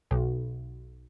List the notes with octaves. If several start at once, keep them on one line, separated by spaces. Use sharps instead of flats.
B1